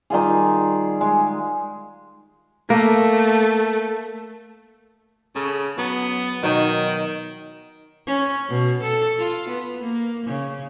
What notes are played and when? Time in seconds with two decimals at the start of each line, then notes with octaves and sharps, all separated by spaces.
0.10 D#3 G3 F4 G#4
1.01 G#3
2.70 A3 A#3
5.35 C#3 A4
5.78 F#3 B3
6.43 B2 D#3 F#3 D#4
8.07 C#4
8.49 B2
8.83 A4
9.18 F4
9.49 B3
9.81 A#3
10.26 C#3